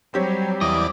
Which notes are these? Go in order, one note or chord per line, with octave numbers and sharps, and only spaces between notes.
F#3 G3 C4 G4 C#5
E2 D5 D#5